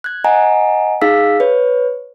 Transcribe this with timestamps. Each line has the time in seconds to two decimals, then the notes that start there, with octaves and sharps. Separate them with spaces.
0.04 F#6 G#6
0.24 D#5 F#5 G#5 A#5
1.01 D#4 G#4 F5 E6 B6
1.40 B4 C#5